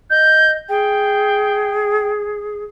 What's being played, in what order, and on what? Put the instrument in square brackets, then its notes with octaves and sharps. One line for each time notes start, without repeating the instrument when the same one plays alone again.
[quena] D#5 [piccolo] G6
[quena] G#4 [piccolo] G5